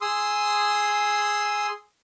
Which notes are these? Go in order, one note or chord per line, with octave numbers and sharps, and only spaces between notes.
G#4 C6 D#6 E6